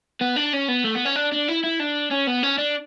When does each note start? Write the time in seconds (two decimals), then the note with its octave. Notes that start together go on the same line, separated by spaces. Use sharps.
0.21 B3
0.36 D4
0.53 C#4
0.69 B3
0.85 A3
0.95 B3
1.06 C#4
1.16 D4
1.32 D4
1.48 E4
1.64 E4
1.80 D4
2.11 C#4
2.27 B3
2.43 C#4
2.58 D4